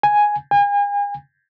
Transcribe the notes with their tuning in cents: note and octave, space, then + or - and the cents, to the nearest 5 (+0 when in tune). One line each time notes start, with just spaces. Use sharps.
G#5 +0
G#5 -40